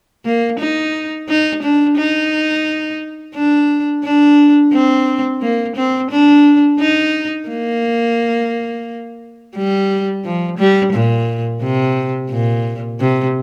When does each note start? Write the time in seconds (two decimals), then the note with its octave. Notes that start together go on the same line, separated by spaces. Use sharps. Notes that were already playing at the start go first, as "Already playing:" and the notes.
0.25 A#3
0.59 D#4
1.29 D#4
1.63 D4
1.98 D#4
3.35 D4
4.04 D4
4.73 C4
5.42 A#3
5.76 C4
6.11 D4
6.80 D#4
7.49 A#3
9.56 G3
10.25 F3
10.58 G3
10.93 A#2
11.62 C3
12.30 A#2
13.00 C3